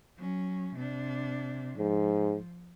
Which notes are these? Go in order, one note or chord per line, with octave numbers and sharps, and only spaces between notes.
F#3 C#4
C3 D4
G#2 F3